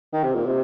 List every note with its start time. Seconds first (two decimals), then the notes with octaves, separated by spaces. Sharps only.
0.13 D#3
0.24 C3
0.35 A#2
0.46 C3